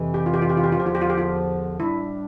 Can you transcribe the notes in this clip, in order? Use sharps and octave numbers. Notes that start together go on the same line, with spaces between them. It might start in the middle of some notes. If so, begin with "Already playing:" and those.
Already playing: F2 C3 E3
G4
F4
G4
F4
G4
F4
G4
F4
E2 D3 F3 G4
F4
G4
F4
G4
F4
A2 G3 D4 E4